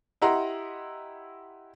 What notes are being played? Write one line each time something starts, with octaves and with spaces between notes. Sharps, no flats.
E4 G4 D#5 F#5 A#5 C6